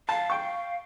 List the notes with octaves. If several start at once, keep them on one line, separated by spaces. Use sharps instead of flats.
F5 A5
G5 C#6